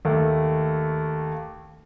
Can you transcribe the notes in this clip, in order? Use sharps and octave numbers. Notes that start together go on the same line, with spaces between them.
D#2 A3